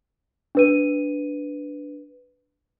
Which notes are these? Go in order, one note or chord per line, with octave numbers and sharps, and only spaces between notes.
D4 B4 D#7